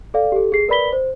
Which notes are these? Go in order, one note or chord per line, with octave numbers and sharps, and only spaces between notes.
A4 D5 F5
G4 A4
G#4 C7
A#4 B4 D5 B5 B6 G7
C5